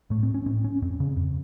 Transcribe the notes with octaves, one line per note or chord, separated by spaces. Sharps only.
A2 A3
C4
C#4
A2 C4
C#4
F2 C4
C#3
F2